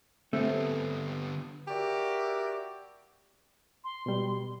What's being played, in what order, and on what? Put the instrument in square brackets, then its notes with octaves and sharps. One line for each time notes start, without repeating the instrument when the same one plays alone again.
[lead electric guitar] D3 B3 [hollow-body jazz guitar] A3 [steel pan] C4
[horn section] F#4 G4 A#4 D5 E5
[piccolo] C6
[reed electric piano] B2 G3